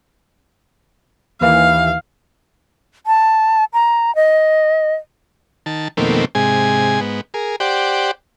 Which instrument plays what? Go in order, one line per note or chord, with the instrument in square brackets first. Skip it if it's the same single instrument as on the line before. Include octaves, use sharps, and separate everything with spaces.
[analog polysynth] D#2 E3 [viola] F5
[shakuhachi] A5
A#5
D#5
[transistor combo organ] D#3 A5
F2 B2 D#3 A3 A#3 C4
G#2 C3 G#4 G#5
G#2 B3
G#4 A#4
G4 C5 D5 F#5 G5